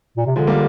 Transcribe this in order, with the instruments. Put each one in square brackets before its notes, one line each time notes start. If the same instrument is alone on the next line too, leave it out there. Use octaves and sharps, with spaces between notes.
[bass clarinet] A#2
C3
[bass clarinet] D3 [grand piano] F3 G#3
[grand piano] G3 A#3